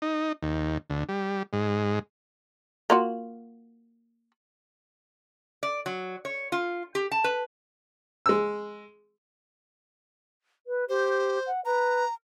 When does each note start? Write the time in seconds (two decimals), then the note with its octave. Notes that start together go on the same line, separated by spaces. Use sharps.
0.02 D#4
0.42 D#2
0.90 D2
1.09 G3
1.53 G#2
2.90 A#3 F4 F#4
5.63 D5
5.86 F#3
6.25 C#5
6.52 F4
6.95 G4
7.12 A5
7.24 B4
8.26 G#3 E6
10.67 B4
10.89 G4 C5
11.47 F#5
11.65 B4 A#5